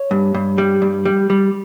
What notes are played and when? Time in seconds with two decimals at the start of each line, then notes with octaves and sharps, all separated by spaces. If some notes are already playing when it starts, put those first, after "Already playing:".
Already playing: C#5
0.11 G2
0.34 G2
0.58 G3
0.82 G2
1.05 G3
1.30 G3